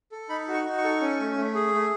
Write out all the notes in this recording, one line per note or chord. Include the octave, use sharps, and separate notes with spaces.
A4
D#4 B5
F#4
C#6
D#4
C#6
A4
C#4
A3
A3
G#4
A3